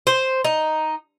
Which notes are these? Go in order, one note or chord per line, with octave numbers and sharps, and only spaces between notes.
C5
D#4